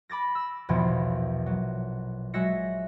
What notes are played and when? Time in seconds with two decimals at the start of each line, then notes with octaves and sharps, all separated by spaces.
0.09 B5 D6 A6 A#6
0.35 E6
0.69 A#1 E2 B2 F3
1.46 F#3
2.34 F#3 G#3 F#4 E5 A#6 C#7